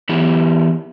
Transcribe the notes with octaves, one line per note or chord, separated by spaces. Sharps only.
E3 B3 E4 G4